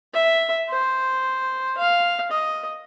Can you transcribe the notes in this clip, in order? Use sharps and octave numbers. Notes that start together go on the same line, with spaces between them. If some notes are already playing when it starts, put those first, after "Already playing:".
E5
C5
F5
D#5